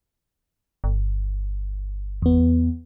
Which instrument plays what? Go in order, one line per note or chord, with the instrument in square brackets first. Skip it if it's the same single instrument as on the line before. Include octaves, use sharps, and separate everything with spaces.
[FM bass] G1
[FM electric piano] E2 B3